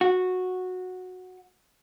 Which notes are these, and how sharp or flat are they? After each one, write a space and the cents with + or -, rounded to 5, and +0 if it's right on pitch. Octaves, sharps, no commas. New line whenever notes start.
F#4 -10